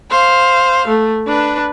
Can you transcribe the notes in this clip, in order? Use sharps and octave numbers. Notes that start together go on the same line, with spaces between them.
C5 F5
A3
D4 B4